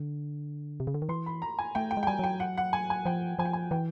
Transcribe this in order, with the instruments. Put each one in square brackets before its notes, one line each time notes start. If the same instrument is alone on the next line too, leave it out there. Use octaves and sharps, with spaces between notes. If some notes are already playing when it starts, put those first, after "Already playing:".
Already playing: [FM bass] D3
C3
C#3
D3
D#3
[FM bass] E3 [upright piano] C6
[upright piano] B5
A#5
G#5
[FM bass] A3 [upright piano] G5
[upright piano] G5
[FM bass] G#3
[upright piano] G5
[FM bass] G3 [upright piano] G#5
[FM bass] F#3 [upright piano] G5
[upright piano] F#5
F#5
G#5
G#5
[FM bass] F3 [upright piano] G5
[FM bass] F3 [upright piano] G#5
[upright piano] G5
G#5
[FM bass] E3 [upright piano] G5